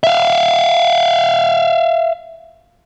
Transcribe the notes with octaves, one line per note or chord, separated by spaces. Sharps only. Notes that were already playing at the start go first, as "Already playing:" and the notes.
E5 F5